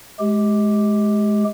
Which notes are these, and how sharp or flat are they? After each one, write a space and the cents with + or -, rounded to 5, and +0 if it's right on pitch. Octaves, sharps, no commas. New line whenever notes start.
G#3 +25 G4 +0